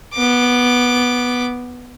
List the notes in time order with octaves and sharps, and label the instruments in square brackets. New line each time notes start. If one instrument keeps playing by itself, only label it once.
[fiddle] B3 D6